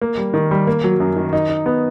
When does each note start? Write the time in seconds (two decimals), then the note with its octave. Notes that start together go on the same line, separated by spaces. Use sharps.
0.02 A#3
0.18 G3
0.34 D#3
0.51 G3
0.67 A#3
0.84 F#3
1.00 F#2
1.16 D#3
1.33 D#4
1.49 D#4
1.66 B3